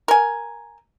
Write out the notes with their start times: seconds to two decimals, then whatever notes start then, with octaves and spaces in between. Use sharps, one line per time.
0.08 A#4 G#5